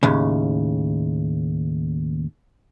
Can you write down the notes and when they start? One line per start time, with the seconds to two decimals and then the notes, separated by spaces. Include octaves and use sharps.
0.03 D#2 A2 C#3